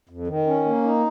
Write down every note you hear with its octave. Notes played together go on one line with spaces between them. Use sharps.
F2
D#3
C#4
A#3
D#4